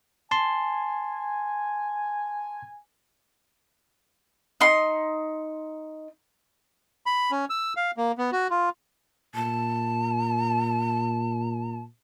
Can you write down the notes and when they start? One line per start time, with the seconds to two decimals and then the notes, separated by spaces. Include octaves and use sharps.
0.31 G#5 A5 C6
4.61 D#4 C6
7.06 B5
7.31 C#4
7.50 E6
7.77 F5
7.97 A#3
8.18 B3
8.32 F#4
8.51 F4
9.35 A#2 A5